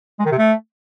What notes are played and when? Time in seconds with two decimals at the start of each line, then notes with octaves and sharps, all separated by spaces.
0.19 G#3
0.25 D#3
0.32 C3
0.38 A3